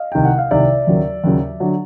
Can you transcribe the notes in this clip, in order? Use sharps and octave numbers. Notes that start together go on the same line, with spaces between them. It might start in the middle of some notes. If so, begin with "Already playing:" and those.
Already playing: D#5 F5
C2 C3 D#3 G5
F#5
F5
C2 C3 D#3 D5 E5
D#2 C#3 F#3
D#2 C#3 F#3
D3 F#3